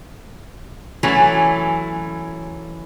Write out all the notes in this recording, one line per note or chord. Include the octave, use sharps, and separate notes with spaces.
E3 F#3 A3 C#4